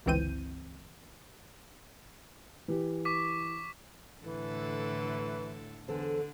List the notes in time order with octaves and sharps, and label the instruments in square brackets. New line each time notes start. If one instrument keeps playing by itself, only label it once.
[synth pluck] G1 C#2 E3 C4 G6 D#7
[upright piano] E3 G4
[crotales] C#6 D6 B6
[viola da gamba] A2 D3 A4 [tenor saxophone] E3
[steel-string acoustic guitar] E2 A4 C5 [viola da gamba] D3